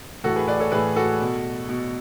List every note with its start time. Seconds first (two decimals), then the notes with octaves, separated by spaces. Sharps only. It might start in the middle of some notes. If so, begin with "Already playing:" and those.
0.24 A2 E3 F#4 A4
0.36 G#4 B4
0.48 B4 D5
0.60 A4 C#5
0.72 A2 E3 G#4 B4
0.96 F#4 A4
1.21 B2
1.69 B2